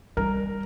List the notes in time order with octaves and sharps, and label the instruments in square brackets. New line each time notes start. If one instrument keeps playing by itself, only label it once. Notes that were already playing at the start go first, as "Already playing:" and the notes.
[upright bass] G3 [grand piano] A#4